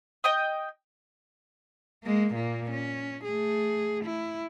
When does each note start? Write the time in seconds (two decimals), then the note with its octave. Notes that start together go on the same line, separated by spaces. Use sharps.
0.24 D#5 G5 D#6
2.04 G#3 A#3
2.35 A#2 A#3
2.70 C#4
3.25 A3 G#4
4.05 E4